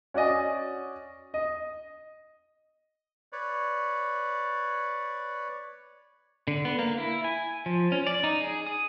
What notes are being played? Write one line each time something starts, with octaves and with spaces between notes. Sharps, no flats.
C#4 F#4 D5 D#5 G#5
D#5
B4 C#5 D5
D3
B3
A#3
E4
G#5
F3
C#4
D5
D#4
G#4
D#6